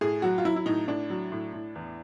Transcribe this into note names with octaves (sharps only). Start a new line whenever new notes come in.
A2 G#4
F#3 F#4
F4
F#3 E4
E4
A2 D#4
A2 D4
F#3
A2
A2
E2